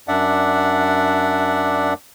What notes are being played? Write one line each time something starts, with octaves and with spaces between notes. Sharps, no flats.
F#2 D4 D5 E5 F#5